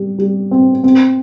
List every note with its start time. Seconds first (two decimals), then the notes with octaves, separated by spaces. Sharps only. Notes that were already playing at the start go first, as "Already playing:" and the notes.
Already playing: G3
0.18 G3
0.51 C4
0.84 C4